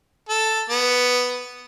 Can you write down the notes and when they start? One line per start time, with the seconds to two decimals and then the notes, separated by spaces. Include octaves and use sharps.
0.29 A4
0.70 B3